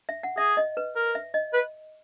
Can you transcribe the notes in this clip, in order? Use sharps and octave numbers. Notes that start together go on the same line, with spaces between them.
E5
F#5
G#4 E5
D#5
B4
A#4
E5
D#5
B4